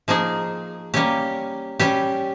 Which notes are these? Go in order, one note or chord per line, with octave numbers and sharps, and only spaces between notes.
F3 A#3 D#4 G#4
G3 A#3 C#4 G4
G3 C#4 G4